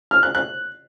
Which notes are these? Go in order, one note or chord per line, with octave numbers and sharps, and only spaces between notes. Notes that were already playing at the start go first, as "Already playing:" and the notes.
F6
F#6
F#6